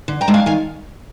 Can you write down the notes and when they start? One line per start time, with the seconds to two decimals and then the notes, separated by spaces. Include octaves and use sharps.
0.08 D3
0.21 G5 A#5
0.28 G#3 D4
0.34 F5 G#5
0.46 D#3 F5 G#5